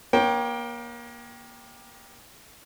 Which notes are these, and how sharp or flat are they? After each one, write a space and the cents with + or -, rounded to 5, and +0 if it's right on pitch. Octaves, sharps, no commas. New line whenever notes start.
A#3 +30 C#5 +0 G5 +0